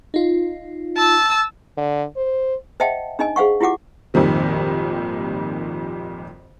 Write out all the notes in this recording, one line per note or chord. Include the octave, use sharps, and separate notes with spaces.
D#4 F4
A5 E6
D3
C5
C5 D#5 E5 F#5 G5 A5
D4 D#4 D#5 G#5
G#4 C5 F5 F#5 C#6
E4 F4 G4 F#5 D6
G#1 F2 A#2 D#3 G3